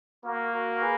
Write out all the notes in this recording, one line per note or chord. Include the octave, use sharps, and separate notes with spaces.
A#3 F#4 A#4
F#4 A#4
G#4 B4